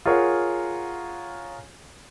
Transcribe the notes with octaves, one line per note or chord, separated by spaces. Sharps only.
F4 G#4 A#4 C#5 F#5